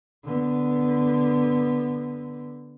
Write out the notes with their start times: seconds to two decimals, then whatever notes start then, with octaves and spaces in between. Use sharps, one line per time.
0.24 D3 B3